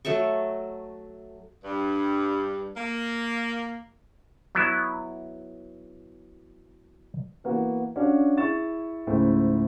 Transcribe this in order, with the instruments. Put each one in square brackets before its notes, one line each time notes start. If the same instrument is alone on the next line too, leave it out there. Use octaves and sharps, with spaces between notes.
[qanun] F#3 A3 A4 C#6
[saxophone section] G2
A#3
[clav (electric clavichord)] F#3 B3 E4
[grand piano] E3 A#3 B3 F#4
C#4 D4 F#4 D5 F5
E4 G#4 C#6 A6 E7
C#2 G#2 A3 E4 C5